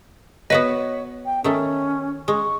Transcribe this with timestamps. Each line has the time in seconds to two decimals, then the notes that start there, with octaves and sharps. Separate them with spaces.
0.50 B3 F#4 B4 C#5 D#5
1.25 G5
1.44 D#3 A3 C#4
2.28 G#3 C#6